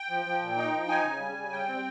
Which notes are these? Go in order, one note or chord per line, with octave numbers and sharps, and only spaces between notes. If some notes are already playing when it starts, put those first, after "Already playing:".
Already playing: G5
F3
F3
A#2
D#4
F3
D#4 G#5
C#3
G3
C#3
G3 G5
C4